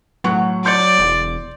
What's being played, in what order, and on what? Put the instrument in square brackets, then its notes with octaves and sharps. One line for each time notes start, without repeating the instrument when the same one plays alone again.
[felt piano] A2 F#5 C#6 [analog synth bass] F#3
[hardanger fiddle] D5 [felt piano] C6 G6 C#7
[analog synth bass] E1